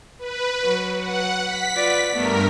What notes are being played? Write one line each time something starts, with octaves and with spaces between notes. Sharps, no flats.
B4
F#3
F#5
B6
F4 B4 D5
G2 A3 B3 A#4